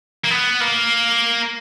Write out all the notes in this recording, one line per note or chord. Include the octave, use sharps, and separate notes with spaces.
A#3
B3
A#3